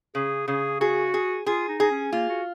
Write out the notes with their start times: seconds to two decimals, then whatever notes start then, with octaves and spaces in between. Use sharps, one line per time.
0.15 C#3 G#4
0.48 C#3 G#4
0.80 F#4 G#4
1.14 G#4
1.46 F4 G#4
1.69 D#4
1.80 D#4 G#4
1.91 C#4
2.12 A#3 F4
2.29 F#4